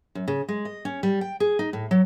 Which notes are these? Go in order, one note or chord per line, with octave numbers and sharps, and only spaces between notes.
F#2
C#3
G#3
D#5
C#4
G3
G5
G#4
D#4
A2
F#3